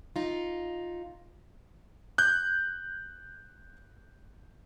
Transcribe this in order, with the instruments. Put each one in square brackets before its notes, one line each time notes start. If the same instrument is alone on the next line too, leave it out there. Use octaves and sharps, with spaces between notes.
[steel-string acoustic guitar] D#4 F4
[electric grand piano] F#6 G6